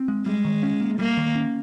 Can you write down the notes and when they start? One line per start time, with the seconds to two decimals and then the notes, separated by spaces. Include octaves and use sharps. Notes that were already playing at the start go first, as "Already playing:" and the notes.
Already playing: C4
0.08 G#3
0.26 G3 G#3
0.45 D#3
0.63 C#4
0.80 A#3
0.99 G3 A#3
1.17 D#3
1.35 C#4